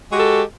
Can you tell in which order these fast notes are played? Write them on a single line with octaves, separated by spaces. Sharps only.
G#3 F#4 G4 A4